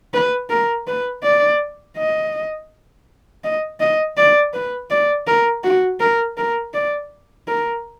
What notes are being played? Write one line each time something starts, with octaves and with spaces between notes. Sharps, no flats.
B4
A#4
B4
D5
D#5
D#5
D#5
D5
B4
D5
A#4
F#4
A#4
A#4
D5
A#4